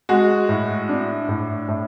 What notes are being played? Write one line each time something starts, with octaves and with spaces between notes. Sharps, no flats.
G#3 F#4
A2
D4
A2
A2